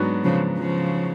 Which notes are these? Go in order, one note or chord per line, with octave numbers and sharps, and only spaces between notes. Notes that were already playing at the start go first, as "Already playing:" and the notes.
Already playing: G#2 F#3 B3 D4 F#4
C#3 F3
C#3 F3